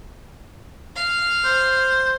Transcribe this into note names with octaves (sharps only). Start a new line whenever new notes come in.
F5
C5